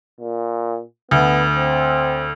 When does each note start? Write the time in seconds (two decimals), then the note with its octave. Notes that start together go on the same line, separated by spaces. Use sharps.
0.21 A#2
1.11 D2 B3
1.56 C4